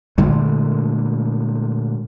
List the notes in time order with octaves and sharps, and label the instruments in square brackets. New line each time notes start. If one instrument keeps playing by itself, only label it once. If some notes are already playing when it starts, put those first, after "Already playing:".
[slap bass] A#2 D3 G#3 A3